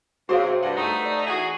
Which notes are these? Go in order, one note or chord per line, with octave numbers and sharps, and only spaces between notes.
C3 F#3 F#4 G#4 C5 F5
G2 F#5
A3 D#4
D5
E3 F#4 G#4